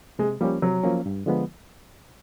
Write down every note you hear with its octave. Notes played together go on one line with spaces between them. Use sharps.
C3 G#3
F3 G3 A#3 C#4
C3 F#3
F3 A#3 C#4
G2
D3 F3 G#3 B3